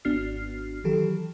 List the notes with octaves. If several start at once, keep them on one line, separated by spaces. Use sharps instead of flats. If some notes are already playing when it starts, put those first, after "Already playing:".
G#1 B3 D4 F#4 F6 C7
D#3 E3 F#3 G4 A4